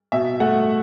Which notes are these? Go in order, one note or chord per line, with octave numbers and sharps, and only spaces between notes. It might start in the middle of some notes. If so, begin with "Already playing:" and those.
B2 E5
A3 F#5